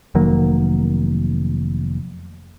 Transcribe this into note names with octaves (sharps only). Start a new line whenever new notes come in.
F1 D#3 F#3 A#3